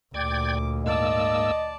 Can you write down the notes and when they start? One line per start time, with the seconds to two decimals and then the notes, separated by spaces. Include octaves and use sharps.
0.14 D2 A#2 D5 G5 D6 G#6
0.86 G#2 A#3 D5 D#5 A5 E6